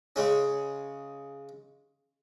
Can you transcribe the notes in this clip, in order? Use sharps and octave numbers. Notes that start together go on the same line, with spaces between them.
C#3 G#3 C#4